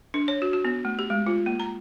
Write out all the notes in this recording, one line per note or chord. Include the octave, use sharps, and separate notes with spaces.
D4
C#5
F#4
F#4
B3
A3
G4
G#3
F4
A#3
A#5